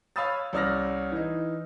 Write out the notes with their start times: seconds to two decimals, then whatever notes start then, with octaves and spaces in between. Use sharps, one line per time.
0.16 C#5 F5 B5 D#6 E6 A6
0.53 C2 C#4 D5 E6 F6 A#6
1.12 E3 D#4